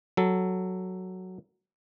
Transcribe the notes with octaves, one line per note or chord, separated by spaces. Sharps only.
F#3 A4